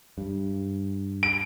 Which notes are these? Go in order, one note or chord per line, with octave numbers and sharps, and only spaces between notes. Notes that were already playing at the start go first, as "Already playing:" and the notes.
G2
D7